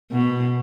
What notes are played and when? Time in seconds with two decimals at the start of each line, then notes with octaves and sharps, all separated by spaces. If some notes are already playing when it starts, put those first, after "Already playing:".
0.12 B2